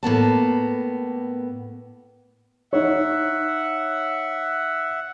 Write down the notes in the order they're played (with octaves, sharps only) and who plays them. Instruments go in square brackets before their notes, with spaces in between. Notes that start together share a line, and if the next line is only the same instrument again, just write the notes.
[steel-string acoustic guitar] A2 A#3 B3 A5
[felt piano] D#4 C#5 [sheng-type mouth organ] E5 F#5